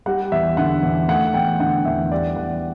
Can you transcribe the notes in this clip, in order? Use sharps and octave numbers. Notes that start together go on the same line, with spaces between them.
G3 F#5
E2 E5
D3 F#5
E2
A3 F#5
E2 G5
D3 F#5
E2 E5
G3 D5
E2 F#5